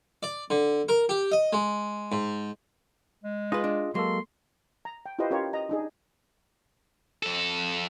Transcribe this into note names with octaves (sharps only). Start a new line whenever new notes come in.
D5
D3
A#4
G4
D#5
G#3
G#2
G#3
D#4 F4 G#4 B4 D#5
D4
F#3 G#3 A#3 A4 C6
A#5
G5
E4 F4 G4 B4 C5 D#5
C#4 F4 G4 A#4 C#5
D#5 A#5
D4 D#4 G#4
F2 A4